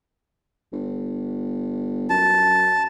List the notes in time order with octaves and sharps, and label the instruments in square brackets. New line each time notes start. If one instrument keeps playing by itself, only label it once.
[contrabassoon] G1
[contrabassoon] F#2 [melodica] A5